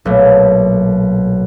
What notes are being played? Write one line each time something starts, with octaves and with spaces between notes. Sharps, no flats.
B1 A#2 F#3 A3